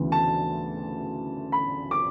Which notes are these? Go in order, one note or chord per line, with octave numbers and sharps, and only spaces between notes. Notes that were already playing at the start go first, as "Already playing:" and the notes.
Already playing: D2 C#3 E3 B3
A5
B5
D6